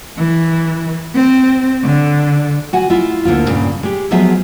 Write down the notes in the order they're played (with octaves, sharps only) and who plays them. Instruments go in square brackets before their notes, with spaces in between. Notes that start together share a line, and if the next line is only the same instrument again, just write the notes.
[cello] E3
C4
D3
[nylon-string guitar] F#4 F#5 G#5
E4 F4 E5
D2 D3 A#3 F4
G2 A#2 C#3
G#3 G4
F3 F#3 G#3 B3 G#4 E5